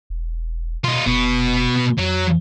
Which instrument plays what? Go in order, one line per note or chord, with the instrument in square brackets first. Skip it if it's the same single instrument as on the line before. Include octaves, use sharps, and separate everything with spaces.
[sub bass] E1
[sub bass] B2 [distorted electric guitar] D#4 F4
[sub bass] F1 [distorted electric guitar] B2 B3
[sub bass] F2 [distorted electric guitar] F#3